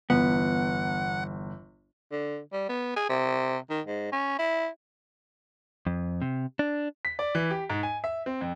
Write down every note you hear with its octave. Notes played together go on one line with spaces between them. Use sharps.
G1 E2 B3 F#5
D3
G3
B3
G#4
C3
D#3
G#2
C#4
E4
F2
C3
D4
B6
D5
E3
G4
G#2
G#5
E5
C4
F2